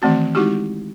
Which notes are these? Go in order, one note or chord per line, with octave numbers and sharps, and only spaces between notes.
D#3 E3 A3 C4 F#4
G#3 D#4 E4 F#4 G4